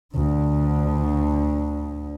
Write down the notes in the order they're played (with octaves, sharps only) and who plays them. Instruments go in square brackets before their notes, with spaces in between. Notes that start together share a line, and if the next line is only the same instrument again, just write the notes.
[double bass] D2 D3